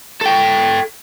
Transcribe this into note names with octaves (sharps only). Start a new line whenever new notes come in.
A4 G5